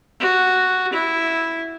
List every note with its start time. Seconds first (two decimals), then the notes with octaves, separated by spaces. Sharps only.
0.20 F#4
0.93 E4